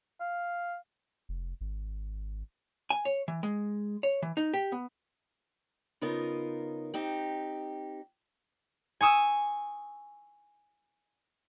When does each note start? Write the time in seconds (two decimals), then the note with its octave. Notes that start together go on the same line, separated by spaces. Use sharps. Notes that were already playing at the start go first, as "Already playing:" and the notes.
0.20 F5
1.29 F1
1.61 G#1
2.90 G#5
3.05 C#5
3.28 E3
3.43 G#3
4.03 C#5
4.22 E3
4.37 D#4
4.54 G4
4.72 B3
6.01 C#3 B3 D#4 F4 A#4
6.94 C4 D#4 G4
9.01 G#5 C#6 D#6 E6